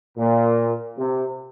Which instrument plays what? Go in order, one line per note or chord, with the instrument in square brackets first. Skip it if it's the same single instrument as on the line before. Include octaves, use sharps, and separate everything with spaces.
[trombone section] A#2
C3